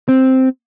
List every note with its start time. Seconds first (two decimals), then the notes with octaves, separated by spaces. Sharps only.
0.09 C4